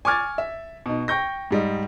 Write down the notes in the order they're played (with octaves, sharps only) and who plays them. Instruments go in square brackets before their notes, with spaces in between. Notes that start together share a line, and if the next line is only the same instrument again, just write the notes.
[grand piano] G#5 C#6 D6 F6 G#6 A6
E5
B2 D#4
G5 C#6 G6 A#6
G#2 G3 D#5